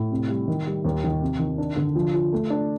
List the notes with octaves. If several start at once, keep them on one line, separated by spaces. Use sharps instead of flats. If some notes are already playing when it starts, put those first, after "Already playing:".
Already playing: A2
C3
G3
D#3
G3
D#2
D#3
C3
D#3
D4
D3
F3
F4
A3
D4